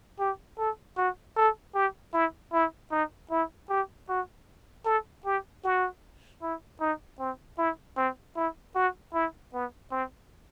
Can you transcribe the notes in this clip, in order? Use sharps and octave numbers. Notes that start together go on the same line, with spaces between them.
G4
A4
F#4
A4
G4
E4
E4
D#4
E4
G4
F#4
A4
G4
F#4
E4
D#4
C4
E4
C4
E4
F#4
E4
B3
C4